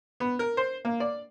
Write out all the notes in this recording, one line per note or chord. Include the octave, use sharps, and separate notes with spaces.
B3
A#4
C5
A#3
D5